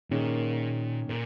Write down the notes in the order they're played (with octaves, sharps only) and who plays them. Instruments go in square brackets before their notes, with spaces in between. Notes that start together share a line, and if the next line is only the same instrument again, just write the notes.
[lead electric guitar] A#2 [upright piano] D#3 A#3 C#4 G#4
[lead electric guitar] A#2 [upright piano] A#4